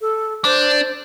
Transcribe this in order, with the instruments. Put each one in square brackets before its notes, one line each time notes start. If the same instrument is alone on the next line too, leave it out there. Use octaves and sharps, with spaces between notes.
[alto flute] A4
[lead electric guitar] D4 [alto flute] C5